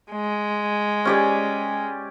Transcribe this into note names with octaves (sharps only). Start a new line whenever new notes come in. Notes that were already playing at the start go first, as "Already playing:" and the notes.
G#3
C#4 G4 D5